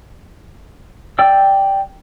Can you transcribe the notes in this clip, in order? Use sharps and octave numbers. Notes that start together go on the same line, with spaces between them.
D5 G5 E6